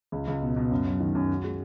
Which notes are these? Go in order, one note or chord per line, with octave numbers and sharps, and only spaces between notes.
C#2
C#2
B2
B2
F#2
F#3
D#3
F#2
F#4
G#3